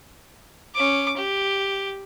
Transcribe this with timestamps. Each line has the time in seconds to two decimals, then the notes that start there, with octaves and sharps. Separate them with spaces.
0.75 C#4 D6
1.16 G4